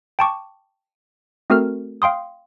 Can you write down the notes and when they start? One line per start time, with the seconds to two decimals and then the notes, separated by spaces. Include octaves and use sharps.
0.19 G5 A5 C#6 D6
1.50 A3 C4 F#4 A4 A#4 F6
2.02 F5 G5 C6 D#6